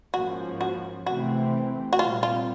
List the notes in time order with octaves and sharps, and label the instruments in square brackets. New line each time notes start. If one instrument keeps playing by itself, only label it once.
[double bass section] G#2 F3 A#3 C#4 [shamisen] F#4
[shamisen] F#4
[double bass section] C3 E3 A3 C4 [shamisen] F#4
[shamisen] F#4
[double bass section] A#2 G3 C4 [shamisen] F4
[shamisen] F4